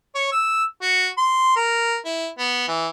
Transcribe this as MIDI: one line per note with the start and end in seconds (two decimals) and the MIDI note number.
0.15 0.30 73
0.32 0.64 88
0.82 1.08 66
1.17 1.53 84
1.56 1.97 70
2.05 2.28 64
2.39 2.68 59
2.68 2.87 52